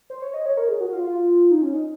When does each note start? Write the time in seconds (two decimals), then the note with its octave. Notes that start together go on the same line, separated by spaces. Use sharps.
0.10 C5
0.22 C#5
0.34 D#5
0.46 C#5
0.57 A#4
0.69 G#4
0.81 F#4
0.92 F4
1.04 F4
1.51 D#4
1.62 C#4
1.74 D#4